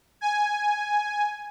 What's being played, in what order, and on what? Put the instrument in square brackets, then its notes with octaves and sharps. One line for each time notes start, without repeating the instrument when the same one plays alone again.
[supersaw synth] G#5